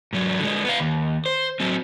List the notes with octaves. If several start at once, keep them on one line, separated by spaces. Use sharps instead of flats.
G#2 F#3
D3 G#3
B3 F5
D#2
C5
F#3 C4